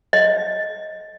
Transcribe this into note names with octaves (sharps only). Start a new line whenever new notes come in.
D#5